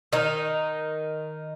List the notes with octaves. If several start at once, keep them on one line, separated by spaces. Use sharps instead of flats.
D#3 D#4